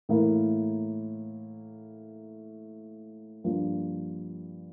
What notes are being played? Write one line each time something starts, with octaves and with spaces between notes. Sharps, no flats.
A2 E3 A#3 E4 A#4
G2 F3 A#3